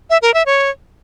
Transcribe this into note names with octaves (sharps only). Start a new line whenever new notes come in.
E5
A#4
E5
C#5